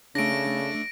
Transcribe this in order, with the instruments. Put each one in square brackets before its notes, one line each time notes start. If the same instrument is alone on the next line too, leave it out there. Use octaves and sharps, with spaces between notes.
[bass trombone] C#3 [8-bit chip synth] A3 D4 [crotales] A#6 D7